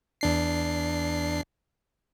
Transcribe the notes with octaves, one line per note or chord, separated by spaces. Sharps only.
E2 D4 C7